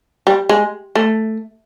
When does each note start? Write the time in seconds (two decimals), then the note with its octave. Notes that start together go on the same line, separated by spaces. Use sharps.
0.27 G3
0.49 G#3
0.95 A3